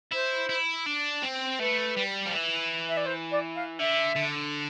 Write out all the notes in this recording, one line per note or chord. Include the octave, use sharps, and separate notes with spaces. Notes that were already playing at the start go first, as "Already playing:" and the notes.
E4 C5
E4
D4
C4
A3 B4
G3
F3
E3
E5
D5
C5
D5
F5
D3 E5
D3